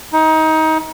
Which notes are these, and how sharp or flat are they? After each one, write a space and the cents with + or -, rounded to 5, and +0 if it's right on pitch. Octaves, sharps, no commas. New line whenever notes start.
D#4 +25